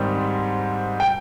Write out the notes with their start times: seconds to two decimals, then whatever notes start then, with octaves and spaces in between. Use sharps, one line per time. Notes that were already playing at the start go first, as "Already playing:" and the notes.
Already playing: G#2 D#3 G3 C4
1.00 G5